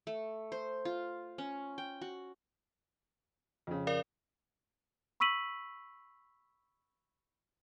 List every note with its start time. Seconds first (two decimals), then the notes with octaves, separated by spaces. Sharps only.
0.07 A3
0.52 C5
0.85 F4
1.38 C#4
1.78 G5
2.01 F#4
3.67 F2 C#3
3.87 A#4 D5 F5
5.20 B5 C#6 E6 B6 D#7 F#7